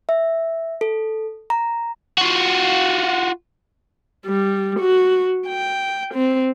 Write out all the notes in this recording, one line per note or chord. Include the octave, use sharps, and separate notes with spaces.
E5
A4
A#5
F4 F#4
G3
F#4
G5
C4